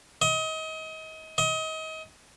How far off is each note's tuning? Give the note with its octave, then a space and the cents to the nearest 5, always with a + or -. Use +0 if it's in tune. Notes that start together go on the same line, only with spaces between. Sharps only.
D#5 +30
D#5 +30